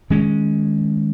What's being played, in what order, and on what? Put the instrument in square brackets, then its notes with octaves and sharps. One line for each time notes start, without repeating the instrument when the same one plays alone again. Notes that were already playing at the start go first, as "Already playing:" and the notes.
[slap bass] D#3 G#3 C#4